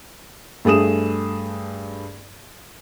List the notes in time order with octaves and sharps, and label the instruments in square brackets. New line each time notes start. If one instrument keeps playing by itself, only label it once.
[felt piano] G2 A3 G#4 D#6 E7